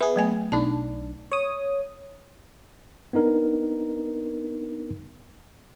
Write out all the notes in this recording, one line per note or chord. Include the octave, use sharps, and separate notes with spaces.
B3 G#4 E5
F#3 A3 G#5
B1 D4 D#4 A5
C#5 D#6
B3 D4 D#4 A#4